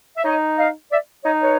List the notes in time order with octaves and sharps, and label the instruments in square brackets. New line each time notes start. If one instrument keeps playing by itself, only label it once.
[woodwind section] E5
[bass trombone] D#4 [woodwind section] C#5 D#5
[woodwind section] D#5 F5
D5 E5
[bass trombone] D#4 [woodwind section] C#5 D#5
[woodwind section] B4 C#5